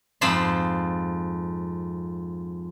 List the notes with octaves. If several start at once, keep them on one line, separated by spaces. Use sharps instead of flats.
F2 G#2 A5 B5 C6